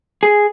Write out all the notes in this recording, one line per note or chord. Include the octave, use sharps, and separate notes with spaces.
G#4